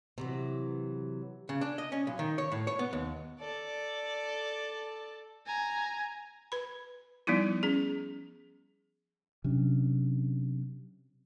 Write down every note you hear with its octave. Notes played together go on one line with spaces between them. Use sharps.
C3 E3 F#3
C#3
D4
D#5
C#4
B1
D#3
C#5
A2
C#5
B3
D#2
A4 D5
G#5 A#5
B4 B5
F3 G3 B3 D#4 E4
C#4 G#4
C3 F#3 C#4 D4